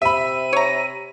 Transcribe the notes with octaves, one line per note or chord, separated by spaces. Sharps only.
C3 E5 B5 D#7
C#5 A#5